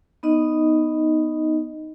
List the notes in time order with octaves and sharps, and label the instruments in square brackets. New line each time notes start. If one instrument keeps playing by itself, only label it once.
[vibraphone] B3 D#4 D#5